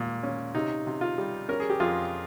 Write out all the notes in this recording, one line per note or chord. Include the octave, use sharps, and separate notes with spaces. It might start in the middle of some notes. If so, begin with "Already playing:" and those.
Already playing: D#2 A#2 G#3
C#4
C3 D#4
C3
F4
G3
C#4 A#4
G#4
G4
F2 F4 G#4